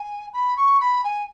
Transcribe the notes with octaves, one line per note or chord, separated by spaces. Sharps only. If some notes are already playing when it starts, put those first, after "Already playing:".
Already playing: G#5
B5
C#6
B5
G#5